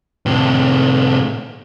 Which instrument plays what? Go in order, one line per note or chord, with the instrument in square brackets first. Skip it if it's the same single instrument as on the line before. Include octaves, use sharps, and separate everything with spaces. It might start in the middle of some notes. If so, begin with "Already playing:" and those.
[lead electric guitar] A2 C3